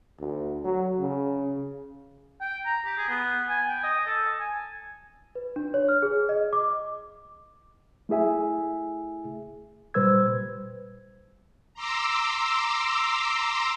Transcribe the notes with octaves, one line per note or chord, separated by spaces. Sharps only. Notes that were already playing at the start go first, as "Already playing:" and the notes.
D2
F#3
C#3
G5
A#5
G4
G#4
B3
G#5
G5
D#5
A4
G#5
B4
D4
C#5
F6
G#4
D#5
D6
A3 E4 G#4 E5 G#5
A#2 G3 B4 C5 E6 G#6
A#5 C6 D6 E6